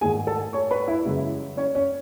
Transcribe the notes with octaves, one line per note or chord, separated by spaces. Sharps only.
G#2 D#3 A3 G#4 G#5
A4 A5
C#5 C#6
B4 B5
E4 E5
F#2 C#3 E3 G#3
C#4 C#5
C#4 C#5